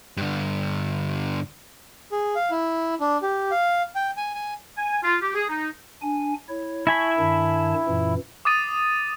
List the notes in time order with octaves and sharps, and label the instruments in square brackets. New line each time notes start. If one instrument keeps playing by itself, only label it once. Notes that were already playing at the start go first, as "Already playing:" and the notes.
[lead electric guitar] G2 D3
[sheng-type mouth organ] G#4
F5
E4
D4
G4
F5
G5
G#5
G#5
[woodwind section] G#5
F4
G4
G#4
D#4
[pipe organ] D4 G#5
E4 C#5
[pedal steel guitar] E4 G#5 B5 [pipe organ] A5 C#6
[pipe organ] G2 D#3 A5
F#2 A#2 E3
[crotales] D6 D#6 A6 D#7